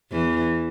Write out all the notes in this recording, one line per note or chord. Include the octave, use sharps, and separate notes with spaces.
E2 E3